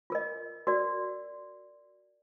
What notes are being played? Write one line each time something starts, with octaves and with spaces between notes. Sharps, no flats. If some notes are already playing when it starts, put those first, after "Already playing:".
F4 A#4 D#5
F#4 A#4 D5